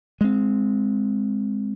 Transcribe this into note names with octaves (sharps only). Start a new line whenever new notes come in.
G#3 C4